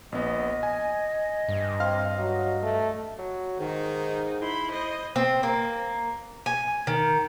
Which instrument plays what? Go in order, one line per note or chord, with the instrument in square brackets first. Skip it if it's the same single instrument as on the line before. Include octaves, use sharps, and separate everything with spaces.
[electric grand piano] A#1 B3 [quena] D#5
[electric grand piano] G#5
[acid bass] G2
[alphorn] C4 [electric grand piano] F5 C6 F6
[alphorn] F#3
A3
[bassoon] F#3
[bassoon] G#2 [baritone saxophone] D#3 [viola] D#4
[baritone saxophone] E4 [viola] B5 C6
[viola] C5 D#5
[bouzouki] C4
A#3
G#5
D#3